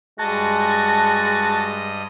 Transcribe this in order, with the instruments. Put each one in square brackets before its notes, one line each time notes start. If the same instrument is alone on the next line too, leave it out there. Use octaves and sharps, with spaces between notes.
[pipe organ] G2 D#5 [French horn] G#3 [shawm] F#4 [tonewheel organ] A5